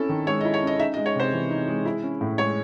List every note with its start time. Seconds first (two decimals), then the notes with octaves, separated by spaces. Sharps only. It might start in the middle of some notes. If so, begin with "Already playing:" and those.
Already playing: C4 C#4 E4 A4
0.09 D#3
0.27 G#3 C#5
0.41 D#5
0.45 E4
0.54 C#5
0.62 C#4 D#5
0.79 D#4 E5
0.94 D#5
0.97 G#3
1.06 C#5
1.16 C3 C5
1.33 E3
1.51 D#4
1.68 G#3
1.85 E4
2.03 C#4
2.21 A2
2.38 G#3 C#5